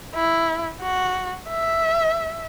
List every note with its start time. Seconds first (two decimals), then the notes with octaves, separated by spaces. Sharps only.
0.15 E4
0.82 F#4
1.49 E5